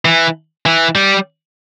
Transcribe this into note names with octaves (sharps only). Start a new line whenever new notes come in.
E3
E3
G3